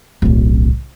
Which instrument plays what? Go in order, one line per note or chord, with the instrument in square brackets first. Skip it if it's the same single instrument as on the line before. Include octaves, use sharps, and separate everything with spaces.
[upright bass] D1 B1